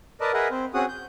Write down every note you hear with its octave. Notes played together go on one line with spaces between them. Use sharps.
A#4 B4 D5 D#5 A5
G#4 A#4 B4 D#5 E5 F#5
C4 C5
C4 C#4 F#4 G#4 F#5 D#6
G6